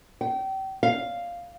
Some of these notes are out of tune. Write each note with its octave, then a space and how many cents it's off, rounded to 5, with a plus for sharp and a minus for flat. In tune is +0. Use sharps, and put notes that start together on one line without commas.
G5 -30
F5 +0